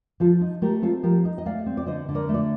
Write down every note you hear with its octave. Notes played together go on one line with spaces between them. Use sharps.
F3 F4 A4
D#4
A3 G4 A#4
C4 F4 A4
F3 G4 A#4
D#4
D#5
A3 D5 F5
C4
D5
D3 C5 D#5
D3
A#4 D5
A3
D5